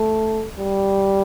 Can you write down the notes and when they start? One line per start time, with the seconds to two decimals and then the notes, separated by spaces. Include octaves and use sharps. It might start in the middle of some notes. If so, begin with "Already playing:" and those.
Already playing: A3
0.59 G3